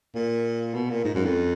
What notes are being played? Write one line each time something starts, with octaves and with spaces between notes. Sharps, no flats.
A#2
B2
A#2
G#2
F#2
F2